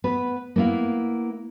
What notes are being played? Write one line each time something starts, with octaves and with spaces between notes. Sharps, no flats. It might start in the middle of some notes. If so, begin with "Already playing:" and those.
B3 B4
A#3 B3 E4 F5